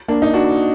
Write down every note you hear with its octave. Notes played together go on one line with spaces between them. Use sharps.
A#3 D4
D#4
D4 F#4